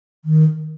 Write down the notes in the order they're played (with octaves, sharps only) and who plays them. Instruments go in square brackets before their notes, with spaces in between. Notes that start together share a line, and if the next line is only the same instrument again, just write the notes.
[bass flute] D#3